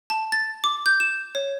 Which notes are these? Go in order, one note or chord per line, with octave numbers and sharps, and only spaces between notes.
A5
A6
D6
G6
E7
C#5